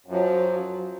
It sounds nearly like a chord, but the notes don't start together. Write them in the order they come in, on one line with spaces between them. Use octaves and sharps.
F#2 F3 F#3